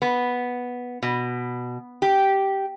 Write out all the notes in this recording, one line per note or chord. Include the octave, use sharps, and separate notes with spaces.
B3
B2
G4